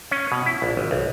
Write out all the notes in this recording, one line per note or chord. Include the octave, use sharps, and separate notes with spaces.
C#4
B2
E4
A#1
G#1
B1